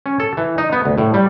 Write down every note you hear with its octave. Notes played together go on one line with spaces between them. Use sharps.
C#4
A4
E3
D#4
B3
D2
A2
G3